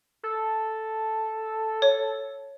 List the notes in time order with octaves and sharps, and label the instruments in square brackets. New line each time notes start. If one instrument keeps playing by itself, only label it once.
[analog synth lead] A4
[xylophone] C#5